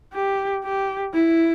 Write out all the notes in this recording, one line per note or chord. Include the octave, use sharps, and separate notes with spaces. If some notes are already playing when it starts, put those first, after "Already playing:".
G4
G4
E4